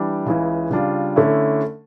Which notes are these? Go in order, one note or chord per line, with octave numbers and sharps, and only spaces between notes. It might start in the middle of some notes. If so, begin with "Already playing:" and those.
Already playing: E3 G3 D4
C#2 C#3 E3
C#3 G3 D4 F4
D3 A3 C#4 E4